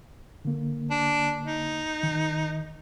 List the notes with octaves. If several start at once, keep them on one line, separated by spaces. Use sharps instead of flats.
D3 A#3
D4
D#4
D#3